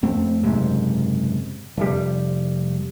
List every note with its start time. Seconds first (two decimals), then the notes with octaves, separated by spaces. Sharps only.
0.03 F2 A3 C4
0.43 F#1 G#2 C3
1.77 F1 G3